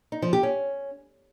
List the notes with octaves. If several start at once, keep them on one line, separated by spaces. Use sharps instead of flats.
D#4
F3
G4
C#4